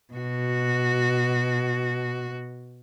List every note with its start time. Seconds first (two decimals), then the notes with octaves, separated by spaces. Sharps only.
0.14 B2 F#4